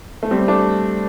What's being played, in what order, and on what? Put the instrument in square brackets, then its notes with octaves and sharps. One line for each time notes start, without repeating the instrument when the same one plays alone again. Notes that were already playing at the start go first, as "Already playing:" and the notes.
[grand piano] A3
G3 C4
A3 D4